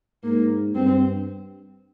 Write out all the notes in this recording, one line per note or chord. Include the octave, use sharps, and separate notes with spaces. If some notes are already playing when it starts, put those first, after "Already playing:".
G#2 A#3
G2 C4